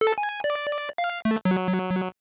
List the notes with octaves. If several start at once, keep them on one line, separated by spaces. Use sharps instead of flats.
A4
G#5
D5
F5
A3
F#3